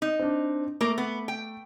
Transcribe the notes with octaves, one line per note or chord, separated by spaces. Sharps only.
D#4
C4 D4
A3 A#3 A#4
B3
G5